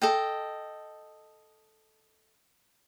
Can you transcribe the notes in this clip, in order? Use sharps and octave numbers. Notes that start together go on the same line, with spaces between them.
A4 D#5 G5